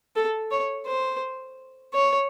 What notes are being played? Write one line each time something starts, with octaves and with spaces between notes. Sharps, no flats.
A4
C#5
C5
C#5